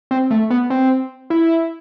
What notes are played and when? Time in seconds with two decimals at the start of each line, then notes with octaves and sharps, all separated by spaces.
0.11 C4
0.31 A3
0.50 B3
0.70 C4
1.30 E4